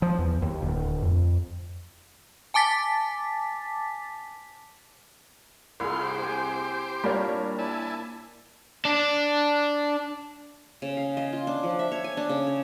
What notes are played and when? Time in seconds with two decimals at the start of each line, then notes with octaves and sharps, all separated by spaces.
0.02 F3
0.19 E2
0.42 D#2
0.62 D1
1.02 F2
2.54 G#5 A5 D6 A6 B6
5.80 C2 E4 F4 G#4 A#5 C6
6.03 G4 C5
6.22 C3 G#5
7.04 A#2 G3 D4 A#4 C#5
7.59 E4 G#5 A5
8.85 D4
10.82 C#3
10.97 F5
11.17 D#5
11.32 F4
11.47 D4
11.63 F3
11.79 E5
11.92 C#5
12.04 G#5
12.17 D4
12.29 C#3
12.47 C#5